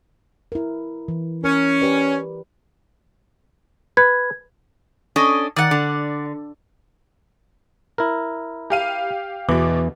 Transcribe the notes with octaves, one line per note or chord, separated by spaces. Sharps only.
E4 A#4
E3
C#4 A#4
G4 B4 D5
B4 G#6
C#4 D4 A4 D#5
D#3 D5 F#5
D3
E4 A#4
G4 F5 D#7
E2 B2 E3 D6